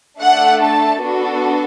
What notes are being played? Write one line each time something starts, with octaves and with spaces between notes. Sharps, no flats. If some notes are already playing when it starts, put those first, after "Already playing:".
A3 D4 A4 F#5
A5
B3 D4 F#4 A4